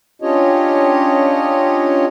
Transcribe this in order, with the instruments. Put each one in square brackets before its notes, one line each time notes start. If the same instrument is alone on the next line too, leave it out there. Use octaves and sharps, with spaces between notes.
[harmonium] C#4 D4 F4 G4 C#5 D#5